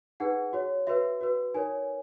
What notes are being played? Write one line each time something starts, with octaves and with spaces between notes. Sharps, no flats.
D#4 G#4 B4 F#5
F#4 C#5
F#4 B4 E5
F#4 B4
D#4 A#4 C#5 G#5